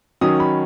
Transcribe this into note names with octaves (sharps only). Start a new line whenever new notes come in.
D#3 F#3 C#4 D#6
B5